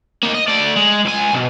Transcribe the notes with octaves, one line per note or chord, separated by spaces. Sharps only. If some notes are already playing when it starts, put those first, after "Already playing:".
A#3 D#4
D#5
A3 D5
G#3
C#2 G#5
B1 B2